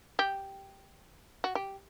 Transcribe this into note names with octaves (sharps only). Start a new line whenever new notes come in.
G4
F#4
G4